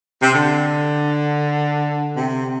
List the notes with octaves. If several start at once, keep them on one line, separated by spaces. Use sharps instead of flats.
C3
D3
C3